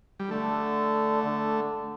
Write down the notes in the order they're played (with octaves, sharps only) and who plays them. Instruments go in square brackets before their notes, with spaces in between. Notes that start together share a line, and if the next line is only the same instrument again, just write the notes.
[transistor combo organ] G3
[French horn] D3 [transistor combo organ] A3
[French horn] D3